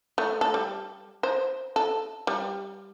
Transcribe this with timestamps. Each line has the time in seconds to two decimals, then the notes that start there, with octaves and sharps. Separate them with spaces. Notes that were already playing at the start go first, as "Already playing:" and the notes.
0.18 A3
0.41 A4
0.54 G3
1.23 C5
1.76 A4
2.27 G3